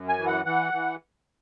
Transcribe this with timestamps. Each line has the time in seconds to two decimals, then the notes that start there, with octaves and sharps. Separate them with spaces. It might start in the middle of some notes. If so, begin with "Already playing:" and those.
Already playing: F#2
0.09 G#5
0.18 E3
0.27 F#5
0.45 E3 F#5
0.73 E3